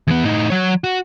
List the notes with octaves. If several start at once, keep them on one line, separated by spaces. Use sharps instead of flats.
E2 B3
A2 D#4
F#3 C#5
F#4